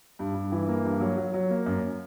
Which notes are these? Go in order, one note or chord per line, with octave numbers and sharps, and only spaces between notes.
G2
G2
E3
A#3
G2
F#3
F#3
F#3
A#3
F#2